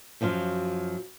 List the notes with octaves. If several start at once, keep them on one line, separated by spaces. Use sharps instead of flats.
F#2 F3 F#3 F4